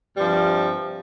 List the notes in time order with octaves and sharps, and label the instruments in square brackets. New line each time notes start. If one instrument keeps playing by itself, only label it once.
[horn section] G2 C3 F3 G3